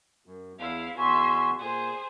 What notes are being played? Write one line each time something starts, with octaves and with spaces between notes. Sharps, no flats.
F#2
E2 E4 F5
E2 F#4 E5 G#5 C6
A#2 G#4 C5